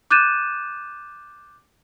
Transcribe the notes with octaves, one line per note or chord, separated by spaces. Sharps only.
D6 F#6 G6 A6 D#7 E7